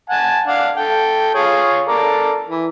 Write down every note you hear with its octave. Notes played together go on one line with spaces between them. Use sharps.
F#5 G#5 A5
D4 F5 F#5
A4 G5
F4 G#4 C#5
A4 A#4 D5
E3